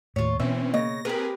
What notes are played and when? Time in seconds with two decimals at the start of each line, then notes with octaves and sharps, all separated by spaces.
0.16 D#2 A2 F4 C#5
0.40 B2 E3 C4 C#4 E5
0.74 C#3 A#3 D#5 A#6
1.05 C4 G4 G#4 A#4 B4